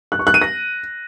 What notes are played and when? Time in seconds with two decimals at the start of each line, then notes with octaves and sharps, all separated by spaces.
0.12 F#6
0.19 C#6
0.27 F#6
0.34 D#7
0.42 A#6